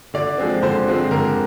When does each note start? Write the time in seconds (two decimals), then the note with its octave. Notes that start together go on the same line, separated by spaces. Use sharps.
0.14 D3 D5
0.38 F3 G#3 C4
0.63 D3 C5
0.87 F3 G#3 C4
1.11 D3 A#4